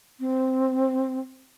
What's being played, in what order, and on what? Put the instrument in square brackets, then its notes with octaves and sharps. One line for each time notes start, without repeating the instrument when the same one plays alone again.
[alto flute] C4